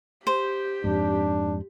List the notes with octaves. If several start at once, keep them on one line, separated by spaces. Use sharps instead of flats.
G4 C5
F2 G#2 D4